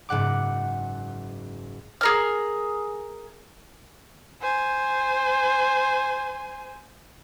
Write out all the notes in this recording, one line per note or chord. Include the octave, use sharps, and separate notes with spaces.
F#1 G#2 F#5 D6
G#4 A#4 F6
C5 G#5